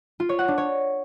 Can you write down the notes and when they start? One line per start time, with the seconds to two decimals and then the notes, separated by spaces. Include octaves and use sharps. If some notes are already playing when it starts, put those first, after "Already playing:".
0.20 F4
0.29 C#5
0.39 F#5
0.48 D4
0.58 C#5